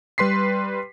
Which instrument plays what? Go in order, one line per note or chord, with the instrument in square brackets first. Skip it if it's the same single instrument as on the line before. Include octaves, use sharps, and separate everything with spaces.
[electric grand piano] G3 B4 C6 B6 C7